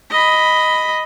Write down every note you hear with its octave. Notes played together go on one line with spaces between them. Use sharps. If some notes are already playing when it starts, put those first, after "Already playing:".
D#5 B5